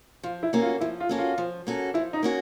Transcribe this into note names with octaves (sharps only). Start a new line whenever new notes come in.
F3 F4
E4
A#3 C#4 F#4 A4
F4
F3 E4
F4
A#3 C#4 F#4 A4
F4
F3
A#3 C#4 F#4 A4
F3 E4
D#4
A#3 C#4 F#4